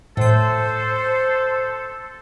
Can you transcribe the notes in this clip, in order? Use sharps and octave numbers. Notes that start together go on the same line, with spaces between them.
A2 A4 C5 G6